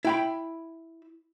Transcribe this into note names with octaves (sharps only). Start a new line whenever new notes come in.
E4 G5 B5